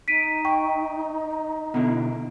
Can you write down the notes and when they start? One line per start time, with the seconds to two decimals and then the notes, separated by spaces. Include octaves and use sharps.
0.08 D#4 B6 D7 D#7
0.45 G5 C#6
1.74 B2 D3 E4